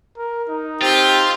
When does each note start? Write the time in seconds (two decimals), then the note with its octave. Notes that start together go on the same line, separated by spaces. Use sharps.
0.17 A#4
0.48 D#4
0.81 C4 F4 G4